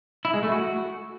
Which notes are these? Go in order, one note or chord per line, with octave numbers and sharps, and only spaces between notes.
E4
G#3
A3
F#4